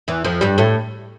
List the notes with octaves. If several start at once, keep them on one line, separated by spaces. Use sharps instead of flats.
E2 E3
F2 F3
G2 G3
A2 A3